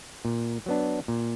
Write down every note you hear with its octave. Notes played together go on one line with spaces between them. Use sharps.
A#2
F#3 B3 D4
A#2